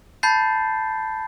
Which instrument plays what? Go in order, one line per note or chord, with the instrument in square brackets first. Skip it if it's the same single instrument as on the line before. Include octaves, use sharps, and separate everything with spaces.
[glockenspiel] A5 B5 G6 A6 C7